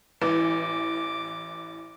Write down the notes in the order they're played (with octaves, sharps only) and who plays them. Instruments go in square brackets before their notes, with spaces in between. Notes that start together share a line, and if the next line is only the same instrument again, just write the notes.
[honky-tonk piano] A1 E3 [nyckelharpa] D6